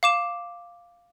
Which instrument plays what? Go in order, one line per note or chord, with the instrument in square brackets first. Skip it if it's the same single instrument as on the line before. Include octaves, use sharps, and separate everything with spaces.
[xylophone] F5 D6 E7